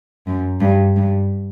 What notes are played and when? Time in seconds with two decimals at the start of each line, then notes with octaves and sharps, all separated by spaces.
0.27 F#2
0.61 G2
0.96 G2